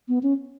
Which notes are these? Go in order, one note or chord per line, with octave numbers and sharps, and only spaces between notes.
B3
C#4